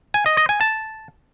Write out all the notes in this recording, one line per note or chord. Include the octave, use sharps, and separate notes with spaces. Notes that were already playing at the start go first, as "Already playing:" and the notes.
G#5
D#5
D#5
G#5
A5